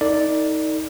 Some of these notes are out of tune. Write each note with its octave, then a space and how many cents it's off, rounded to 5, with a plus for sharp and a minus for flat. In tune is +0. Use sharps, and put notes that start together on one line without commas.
D#4 +25 A4 +45 D5 +0